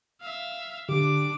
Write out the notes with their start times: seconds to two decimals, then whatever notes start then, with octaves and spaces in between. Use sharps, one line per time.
0.21 E5 F5
0.89 D3 D4 G4 D6